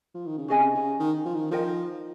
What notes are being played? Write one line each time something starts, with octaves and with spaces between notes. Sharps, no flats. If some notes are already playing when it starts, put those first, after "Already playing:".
F3
D#3
C#3
C3 C#4 G#4 D#5 G#5
C#3
D#3
F3
D#3
F3 D#4 A#4 D#5 G5